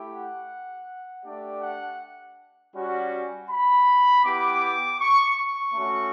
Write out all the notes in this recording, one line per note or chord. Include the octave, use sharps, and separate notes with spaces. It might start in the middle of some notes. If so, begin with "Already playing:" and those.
Already playing: A3 E4 G4
F#5
A3 D4 G4 D5
F#5
G3 C#4 F#4
B5
B3 E4 G4 D6
C#6
C#6
A3 C#4 F#4